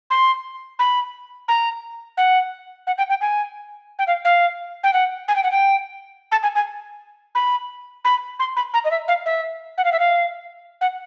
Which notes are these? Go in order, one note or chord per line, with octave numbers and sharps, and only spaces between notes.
C6
B5
A#5
F#5
F#5
G5
G5
G#5
G5
F5
F5
G5
F#5
G#5
G5
F#5
G5
A5
G#5
G#5
B5
B5
C6
B5
A#5
D#5
E5
F5
E5
F#5
F5
E5
F5
F#5